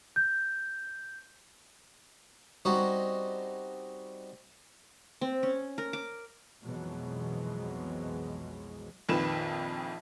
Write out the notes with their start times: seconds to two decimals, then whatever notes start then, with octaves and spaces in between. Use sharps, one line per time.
0.16 G6
2.65 G3 C4 C#4 D#4 F#4
5.21 C4
5.43 C#4
5.78 A#4
5.93 D6
6.61 B1 F2 B2 E3 F#3 G#3
9.09 A#1 F2 D#3 B4 E7